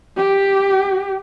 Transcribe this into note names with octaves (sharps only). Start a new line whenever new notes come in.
G4